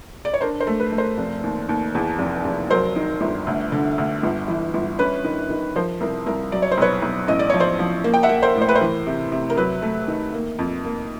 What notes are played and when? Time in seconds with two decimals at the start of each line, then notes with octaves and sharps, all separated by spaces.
0.25 D5
0.34 C#5
0.41 D4 A#4 C5
0.60 A#4 C5
0.67 A3
0.80 B4
0.92 A3
0.98 A#4 C5
1.18 F1
1.43 D#2
1.69 D#2
1.95 E2
2.19 F1
2.45 F1
2.70 F#3 A#4 C5
2.96 D#3
3.21 G1
3.47 D2
3.72 D3
3.98 D2
4.23 G1
4.48 E3
4.74 G1
4.99 C#4 B4
5.24 D#3
5.50 D#3
5.76 F3 A#4 C5
6.01 C2 A#4
6.26 C2 A#4
6.52 F#3 D5
6.62 C#5
6.72 C5
6.78 B1 B4 C#5
7.02 B1
7.28 A1 D#5
7.39 D5
7.50 F3 C#5
7.60 C5 D5
7.79 F3
8.04 A#3
8.14 G5
8.23 E5 F#5
8.29 A#3
8.43 A#4 C5
8.55 A2
8.61 C5
8.69 B4
8.75 A#4 C5
8.81 E3
9.06 C3
9.32 C3
9.50 A#4
9.57 F#3 B4
9.82 A3
10.08 D#3
10.34 A#3
10.59 F2
10.85 A#3